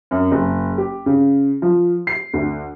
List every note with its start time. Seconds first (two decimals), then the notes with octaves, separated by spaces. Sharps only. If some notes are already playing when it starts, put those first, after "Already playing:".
0.11 F#2
0.31 F#1
0.78 G4
1.06 C#3
1.62 F3
2.07 C7
2.33 D2